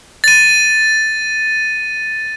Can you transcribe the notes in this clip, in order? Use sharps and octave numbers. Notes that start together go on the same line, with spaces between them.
A6 D#7